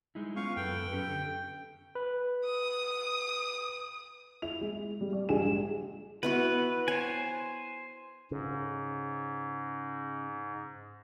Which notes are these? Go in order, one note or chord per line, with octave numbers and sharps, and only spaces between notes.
G#3 D#4 E4
B3 C#4 F4 F5 C#6
F#2 A4 B4 G5
C#4 G4 A4
D3
B4
D#6
E4 F7
G#3
G3
D5
A#1 G2 G#3 G4 G#5 E7
B3 E4 F#4 B4
C5 C#5 G#5
G#2 C#3